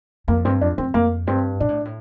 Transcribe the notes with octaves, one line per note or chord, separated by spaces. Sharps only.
F2 A#3
G2 C4
F2 D4
F2 C4
F2 A#3
G2 C4
A#2 D4
A2
A2